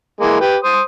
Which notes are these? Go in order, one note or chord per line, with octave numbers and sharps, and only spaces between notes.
E3 G#3 A#3
G4 B4
C5 D#6